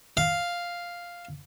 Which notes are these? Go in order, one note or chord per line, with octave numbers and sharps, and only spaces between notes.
F5